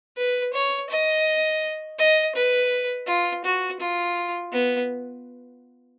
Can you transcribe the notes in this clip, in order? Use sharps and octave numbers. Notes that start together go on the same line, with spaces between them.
B4
C#5
D#5
D#5
B4
F4
F#4
F4
B3